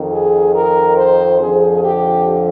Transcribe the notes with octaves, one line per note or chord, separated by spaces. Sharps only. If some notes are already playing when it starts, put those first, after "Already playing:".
Already playing: F2 D#3
G#4
A#4
C5
F2 D3 F3 G#4
G4